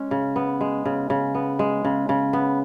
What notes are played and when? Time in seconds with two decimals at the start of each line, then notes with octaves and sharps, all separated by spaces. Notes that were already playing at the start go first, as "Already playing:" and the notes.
Already playing: G#3 C#4
0.11 C#3
0.36 B3
0.61 G#3
0.85 C#3
1.10 C#3
1.35 B3
1.59 G#3
1.85 C#3
2.09 C#3
2.33 B3